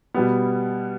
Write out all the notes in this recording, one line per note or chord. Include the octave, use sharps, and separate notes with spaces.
B2 G3 B3